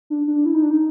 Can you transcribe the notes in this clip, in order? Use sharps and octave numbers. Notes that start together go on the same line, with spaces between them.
D4
D4
E4
D#4
D4
D#4